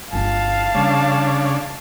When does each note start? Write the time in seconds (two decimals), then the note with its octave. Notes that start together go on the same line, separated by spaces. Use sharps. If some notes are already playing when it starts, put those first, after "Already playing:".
0.13 G1 F4 F5 A5
0.74 C#3 G3 D4